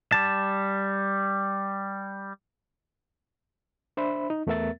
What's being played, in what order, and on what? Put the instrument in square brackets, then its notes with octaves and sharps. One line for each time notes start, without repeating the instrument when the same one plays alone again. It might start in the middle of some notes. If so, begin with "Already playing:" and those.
[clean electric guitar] G3 A5
[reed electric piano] D4 C5 E5 B5
D#4
E2 A3 B3 A#4 E5 A6